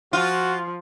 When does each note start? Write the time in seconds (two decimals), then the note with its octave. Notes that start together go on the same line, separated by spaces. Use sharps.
0.13 F3 F4 F#4